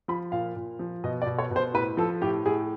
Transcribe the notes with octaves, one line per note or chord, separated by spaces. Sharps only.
F3 B5
A#2 F5
A#2
F3
B2 D#5
D5
B2
C#5
B2 C5
A2 B4
F3 A4
A2 G4
A2 G#4